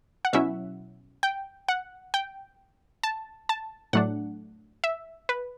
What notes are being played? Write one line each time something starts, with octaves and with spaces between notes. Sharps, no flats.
F#5
B2 F#3 C#4 E4 E5
G5
F#5
G5
A5
A5
A2 F#3 A3 D4 F#5
E5
B4